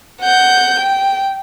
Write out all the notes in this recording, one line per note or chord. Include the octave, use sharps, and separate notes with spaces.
F#5 G6
G5